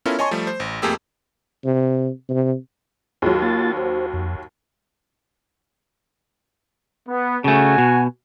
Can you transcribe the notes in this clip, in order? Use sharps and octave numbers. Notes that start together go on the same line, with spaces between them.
B3 C#4 E4 F4 A4 A#4
C#5 D#5 G#5 A5 C6 C#6
F3 G3 A3
C5
A1
F2 A3 A#3 G4 G#4 E6
C3
C3
D#2 F#3 F4 G#4
A#3 F4 A6
F#4 C5
F2
B3
C#3 A3 F#4 G#5
B2